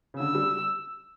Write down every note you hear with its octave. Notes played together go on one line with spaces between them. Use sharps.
C#3
D3 E6
G3